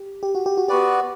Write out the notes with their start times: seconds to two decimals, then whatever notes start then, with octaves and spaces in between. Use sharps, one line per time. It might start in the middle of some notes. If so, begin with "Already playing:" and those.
Already playing: G4
0.23 G4
0.35 F#4
0.46 G4
0.57 F#4
0.68 B3 F#4 G4 B4 D5